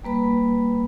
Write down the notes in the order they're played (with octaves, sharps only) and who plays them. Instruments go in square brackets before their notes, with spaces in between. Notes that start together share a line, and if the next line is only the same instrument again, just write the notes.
[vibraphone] G3 A#3 B4 B5